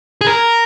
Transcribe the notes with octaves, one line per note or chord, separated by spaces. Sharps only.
G#4
A#4